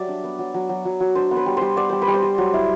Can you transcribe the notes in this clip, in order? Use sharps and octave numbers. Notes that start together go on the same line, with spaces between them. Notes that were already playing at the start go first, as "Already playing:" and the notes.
Already playing: F#3 G3 D5 E5
D4
B3
F#3
F#3
F#3
F#3
F#3
D4 C5
B3
B4
G3
G3 C5
B3 D5
G3 C5
B4
G3
C5
G3
F#3
E4